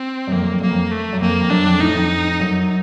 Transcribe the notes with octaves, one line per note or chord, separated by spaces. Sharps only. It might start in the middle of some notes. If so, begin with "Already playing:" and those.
Already playing: C4
F#2
F2 A#3
F#2
F2
F#2 A#3
F2
A3
F#2
F2 A#3
F2
F#2 D4
F2
A2 D#4
F2
F#2